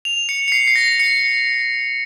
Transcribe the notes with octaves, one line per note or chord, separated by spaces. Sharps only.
F7
C#7
C#7
C7
C7
A#6
C#7